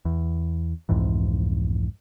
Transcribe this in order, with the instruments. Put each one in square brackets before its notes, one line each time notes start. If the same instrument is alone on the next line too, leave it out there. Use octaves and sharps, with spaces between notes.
[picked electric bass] E2
C2 F2 G#2 E3